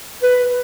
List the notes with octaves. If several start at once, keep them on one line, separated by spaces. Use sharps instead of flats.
B4